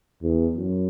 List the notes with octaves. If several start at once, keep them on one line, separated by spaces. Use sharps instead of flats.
E2
F#2